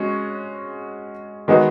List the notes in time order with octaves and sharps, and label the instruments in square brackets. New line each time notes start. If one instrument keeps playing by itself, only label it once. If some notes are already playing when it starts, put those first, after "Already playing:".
Already playing: [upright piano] G#3 C#4 F#4
D#3 G#3 B3 D#4 F#4